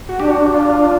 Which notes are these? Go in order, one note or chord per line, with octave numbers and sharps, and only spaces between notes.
F#4
D4 G4
F#4
F4